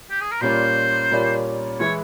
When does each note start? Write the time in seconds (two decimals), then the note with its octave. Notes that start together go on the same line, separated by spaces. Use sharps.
0.10 G4
0.21 G#4
0.31 A#4
0.41 A#2 G3 A#3 C#4 F4 C5
1.11 A#2 G3 A#3 C#4 F4
1.79 E3 G#3 E4 C#5